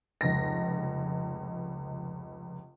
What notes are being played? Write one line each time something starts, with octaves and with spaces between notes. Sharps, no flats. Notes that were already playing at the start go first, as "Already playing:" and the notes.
F1 C#2 A#6